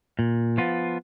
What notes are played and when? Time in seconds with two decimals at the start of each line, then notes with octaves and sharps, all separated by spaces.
0.19 A#2
0.58 F3 B3 F4